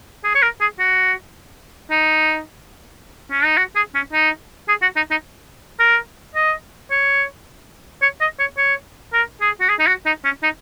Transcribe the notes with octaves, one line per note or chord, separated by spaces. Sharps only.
G#4
C#5
A#4
G#4
F#4
D#4
C#4
D#4
F#4
G#4
C#4
D#4
G#4
F#4
D#4
D#4
A#4
D#5
C#5
C#5
D#5
C#5
C#5
A#4
G#4
F#4
G#4
D#4
F#4
D#4
C#4
D#4